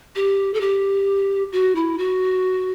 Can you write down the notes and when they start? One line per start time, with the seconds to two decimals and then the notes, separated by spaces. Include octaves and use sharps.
0.15 G4
0.54 A4
0.61 G4
1.52 F#4
1.75 E4
1.98 F#4